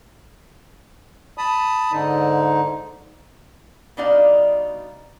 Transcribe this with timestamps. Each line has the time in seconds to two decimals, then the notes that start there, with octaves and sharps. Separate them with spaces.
1.38 A5 B5 D#6
1.92 G#2 D3 D#4
3.97 B2 G3 D4 D#4 D5 F5